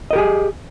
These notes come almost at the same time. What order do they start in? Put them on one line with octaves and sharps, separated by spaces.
D#5 A#4 G4 G#4